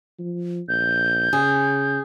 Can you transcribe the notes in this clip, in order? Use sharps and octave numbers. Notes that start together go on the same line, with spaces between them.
F3
A#1 G6
C#3 G#4